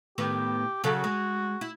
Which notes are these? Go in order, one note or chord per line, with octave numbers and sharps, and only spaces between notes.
A2 D#3 B3 G4
C#3 F#3 F#4 A4
G#3
E4